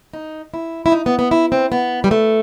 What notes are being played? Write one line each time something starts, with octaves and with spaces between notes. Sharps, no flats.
D#4
E4
E4
D#4
B3
B3
E4
C4
B3
G3
A3